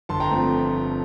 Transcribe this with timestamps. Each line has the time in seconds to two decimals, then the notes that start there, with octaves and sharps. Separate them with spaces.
0.09 G1 A5 C6
0.20 G5 A#5
0.31 F3 A3 C4